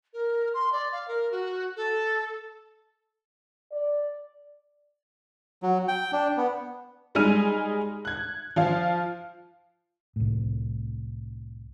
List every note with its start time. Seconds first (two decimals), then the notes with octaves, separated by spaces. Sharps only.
0.13 A#4
0.54 C6
0.72 D5
0.92 F5
1.08 A#4
1.31 F#4
1.76 A4
3.71 D5
5.63 F#3
5.88 G5
6.13 D4
6.37 B3
7.15 G3 G#3 D#4 G#5 F6 D#7
8.05 F#6 G#6
8.56 F3 F4 F5
10.16 C2 A2